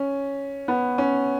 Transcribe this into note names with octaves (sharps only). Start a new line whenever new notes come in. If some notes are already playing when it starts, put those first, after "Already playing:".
Already playing: C#4
B3
C#4